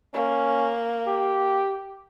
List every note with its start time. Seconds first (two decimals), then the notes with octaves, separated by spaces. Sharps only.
0.14 A#3 C#4
1.07 G4